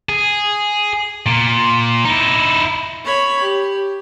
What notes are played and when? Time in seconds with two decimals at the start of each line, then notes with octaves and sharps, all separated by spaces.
0.09 G#4
1.27 A#2
2.05 D#4 E4
3.04 C#5 B5
3.41 G4